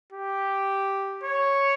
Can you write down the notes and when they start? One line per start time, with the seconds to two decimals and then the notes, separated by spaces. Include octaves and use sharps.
0.12 G4
1.23 C#5